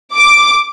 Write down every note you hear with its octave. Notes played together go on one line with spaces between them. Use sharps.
D6